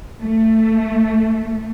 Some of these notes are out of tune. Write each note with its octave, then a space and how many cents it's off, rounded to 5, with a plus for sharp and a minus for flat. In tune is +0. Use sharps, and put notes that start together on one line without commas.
A3 +15